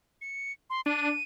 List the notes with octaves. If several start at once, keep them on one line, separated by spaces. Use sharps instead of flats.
C#7
C6
D4 D#7